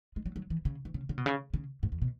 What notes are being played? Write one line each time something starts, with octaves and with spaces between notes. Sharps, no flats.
G#3
F#3
F#3
E3
C#3
E3
C#3
C#3
B2
C#3
C#3
G#2
E2
B2